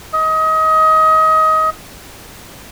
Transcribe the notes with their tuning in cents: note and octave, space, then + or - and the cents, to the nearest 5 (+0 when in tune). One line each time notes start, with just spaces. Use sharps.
D#5 +25